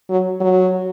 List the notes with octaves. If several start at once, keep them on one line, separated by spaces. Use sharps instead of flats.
F#3
F#3